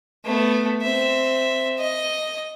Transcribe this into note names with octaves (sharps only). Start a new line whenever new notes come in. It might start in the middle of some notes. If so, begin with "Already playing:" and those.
A3 B3
C4 E5
D#5